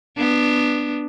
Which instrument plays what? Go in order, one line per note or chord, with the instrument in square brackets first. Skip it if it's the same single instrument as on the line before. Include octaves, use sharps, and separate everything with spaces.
[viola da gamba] B3 D4